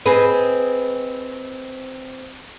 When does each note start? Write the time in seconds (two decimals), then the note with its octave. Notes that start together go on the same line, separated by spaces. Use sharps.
0.06 C4 G#4 B4 D#5